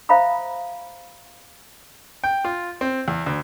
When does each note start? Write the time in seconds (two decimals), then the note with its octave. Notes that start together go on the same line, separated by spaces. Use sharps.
0.09 C5 E5 F5 A#5 B5 D#6
2.24 G5
2.45 F4
2.81 C4
3.08 E2
3.26 D2